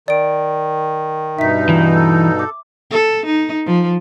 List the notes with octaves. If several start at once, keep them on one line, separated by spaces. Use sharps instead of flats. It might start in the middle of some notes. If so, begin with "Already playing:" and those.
D#3 D5 D7
G2 B2 D#4 E5 B6
E3
A4
D6
A4
D#4
F3